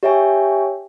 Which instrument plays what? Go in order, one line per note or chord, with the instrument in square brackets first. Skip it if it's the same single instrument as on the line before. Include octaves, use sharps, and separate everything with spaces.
[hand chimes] G4 C#5 E5 G5 G#5